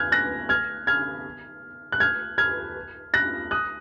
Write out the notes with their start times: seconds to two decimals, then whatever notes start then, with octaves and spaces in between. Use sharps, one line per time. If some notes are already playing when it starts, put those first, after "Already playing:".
Already playing: F6 F#6 G#6
0.12 F#6 A#6
0.49 F6 G#6
0.87 F6 G#6
1.92 F#6
2.00 F6 G#6
2.38 F6 G#6
3.14 F#6 A#6
3.51 D#6 F#6